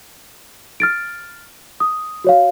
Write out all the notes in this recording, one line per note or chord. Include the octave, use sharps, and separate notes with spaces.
F6 A6 D7
D#6
F#4 C#5 F5